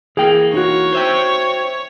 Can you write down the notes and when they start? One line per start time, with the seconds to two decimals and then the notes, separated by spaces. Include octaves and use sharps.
0.17 E3 A#3 G#4 G5
0.54 D#4 F#4 C#5
0.93 C5 E5 G5